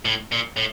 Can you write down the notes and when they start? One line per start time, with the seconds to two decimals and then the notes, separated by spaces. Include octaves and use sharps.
0.05 A2
0.32 A#2
0.57 A2